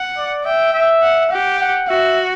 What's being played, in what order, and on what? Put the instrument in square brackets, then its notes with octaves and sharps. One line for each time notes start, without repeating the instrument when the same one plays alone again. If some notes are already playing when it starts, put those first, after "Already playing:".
Already playing: [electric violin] F#5
[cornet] D5
[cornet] E5 [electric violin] G5
[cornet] E5
[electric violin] F#5
[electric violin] G4 [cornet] F#5
[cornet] F#5
[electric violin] F#4 [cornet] E5